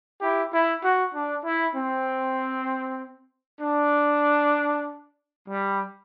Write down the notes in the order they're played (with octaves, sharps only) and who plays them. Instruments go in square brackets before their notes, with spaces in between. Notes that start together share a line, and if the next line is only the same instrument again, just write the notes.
[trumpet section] E4 G4
E4
F#4
D4
E4
C4
D4
G3